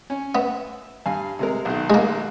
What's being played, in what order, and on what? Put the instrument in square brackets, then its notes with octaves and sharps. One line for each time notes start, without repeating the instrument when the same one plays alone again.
[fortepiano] C#4
[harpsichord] B3 [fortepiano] E5
[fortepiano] G2 F5 G#5
C3 G#3 A#4
B1 D#3
[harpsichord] G#3 A#3